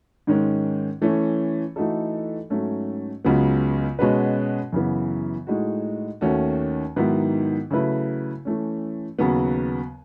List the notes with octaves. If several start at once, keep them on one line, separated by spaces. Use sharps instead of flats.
G#2 D#3 G#3 C#4
E3 A3 C#4
E3 A3 D#4 F#4 A4
G#2 F#3 A3 C#4
C#2 C#3 F#3 B3
B2 G#3 C#4 F#4 B4
F#2 C#3 E3 B3
A2 G#3 D#4 F#4
D#2 D#3 A3 C#4 F#4
G#2 D#3 F#3 B3 E4
C#3 F#3 A3 E4 B4
E3 A3 C#4
D#2 C#3 F#3 B3